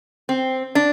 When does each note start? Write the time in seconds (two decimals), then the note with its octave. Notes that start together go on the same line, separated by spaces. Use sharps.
0.29 C4
0.75 D4